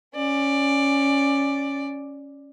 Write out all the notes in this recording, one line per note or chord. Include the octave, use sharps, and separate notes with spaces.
C#4 D5